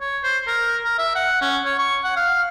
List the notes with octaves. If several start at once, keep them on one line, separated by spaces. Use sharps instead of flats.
C#5
C5
A#4
A#4
E5
F#5
C#4
C#5
C#6
F#5
F5